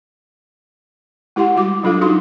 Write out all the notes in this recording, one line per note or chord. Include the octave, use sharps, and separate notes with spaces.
G#3 E4 G4 F#5 C6
G3 F#4 D6
F#3 D4 F4 A4 F5
D4 D#4 F#4 C6